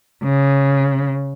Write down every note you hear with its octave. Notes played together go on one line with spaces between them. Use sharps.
C#3